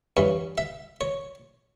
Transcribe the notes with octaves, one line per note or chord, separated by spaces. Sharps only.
G2 E3 C#5
E5
C#5